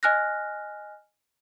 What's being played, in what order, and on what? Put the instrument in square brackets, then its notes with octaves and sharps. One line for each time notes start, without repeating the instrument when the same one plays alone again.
[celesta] D#5 G#5 F6 F#6 A#6